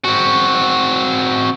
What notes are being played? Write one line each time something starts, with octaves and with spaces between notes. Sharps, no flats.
C4 F#4